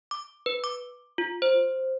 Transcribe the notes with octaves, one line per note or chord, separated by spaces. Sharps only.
D6
B4
D6
F4
C5